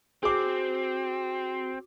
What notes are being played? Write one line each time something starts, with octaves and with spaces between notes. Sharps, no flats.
C4 F#4 G#4 D6